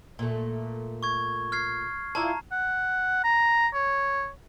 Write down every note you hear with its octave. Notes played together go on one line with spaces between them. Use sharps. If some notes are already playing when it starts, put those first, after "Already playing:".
A#2 A3
C#6 G#6
F6 G#6 C7
E4 F4 D5 A5 A#5
F#5
A#5
C#5